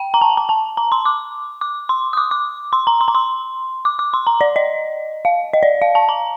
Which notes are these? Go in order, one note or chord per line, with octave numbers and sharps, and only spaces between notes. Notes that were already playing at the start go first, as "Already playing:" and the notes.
Already playing: G5
A#5
A5
A#5
A5
A#5
C6
D6
D6
C6
D#6
D6
D6
C6
A#5
C6
A#5
C6
D6
D6
C6
A#5
D5
D#5
F5
D#5
D5
F5
A5
A#5